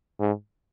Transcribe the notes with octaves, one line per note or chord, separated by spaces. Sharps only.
G#2